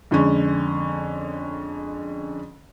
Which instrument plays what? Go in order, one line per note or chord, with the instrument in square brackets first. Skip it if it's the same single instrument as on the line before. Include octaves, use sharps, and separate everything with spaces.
[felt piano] F2 D3 G#3 C#4